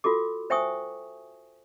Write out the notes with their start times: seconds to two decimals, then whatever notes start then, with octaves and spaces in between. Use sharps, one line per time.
0.04 F4 F#4 A4 D6
0.50 C5 E5 G5 G#5 C#6 D#6